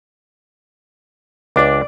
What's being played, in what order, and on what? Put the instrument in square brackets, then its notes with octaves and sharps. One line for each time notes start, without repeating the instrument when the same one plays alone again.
[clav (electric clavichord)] C#2 D4 [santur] D5 D6